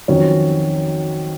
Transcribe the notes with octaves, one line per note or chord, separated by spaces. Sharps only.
F2 D#3 F#3 C#4